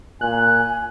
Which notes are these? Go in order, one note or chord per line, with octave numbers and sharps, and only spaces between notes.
A#2 G#5 F#6